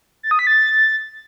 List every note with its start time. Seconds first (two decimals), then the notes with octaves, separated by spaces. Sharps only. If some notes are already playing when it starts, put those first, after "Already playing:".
0.23 A6
0.31 D#6
0.39 B6
0.47 A6